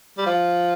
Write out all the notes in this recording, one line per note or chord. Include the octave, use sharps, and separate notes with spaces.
G3
F3